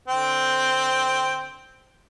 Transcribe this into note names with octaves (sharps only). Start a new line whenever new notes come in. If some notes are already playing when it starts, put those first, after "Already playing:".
D3 C4 G5